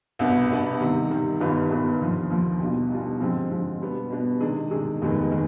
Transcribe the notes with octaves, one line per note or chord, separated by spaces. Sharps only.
C2 B2 B3 D4
C2 B2 B3 D4
C3 D#3 G3
C3 D#3 G3
G1 G2 D#3 B3 F4
G1 G2 D#3 B3 F4
D#2 D3 F3
D#2 D3 F3
B1 B2 G3 D4 F4
B1 B2 G3 D4 F4
D3 F3 G#3 C4
D3 F3 G#3 C4
B2 G3 B3 D4
B2 G3 B3 D4
C3 D#3 G#3 D4 G#4
C3 D#3 G#3 D4 G#4
F1 D#2 D#3 G#3 B3
D#3 G#3